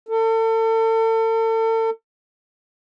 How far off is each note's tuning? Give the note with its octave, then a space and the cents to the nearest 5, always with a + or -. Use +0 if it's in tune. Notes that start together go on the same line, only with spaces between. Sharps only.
A4 +35